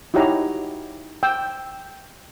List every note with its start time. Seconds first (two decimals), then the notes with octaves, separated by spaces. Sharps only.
0.14 D#4 E4 F#4 G4 C#5 A#5
1.23 G5 E6